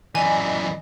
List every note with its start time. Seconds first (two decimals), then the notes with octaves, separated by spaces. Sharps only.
0.15 F#2 E3 D5 D#5 G#5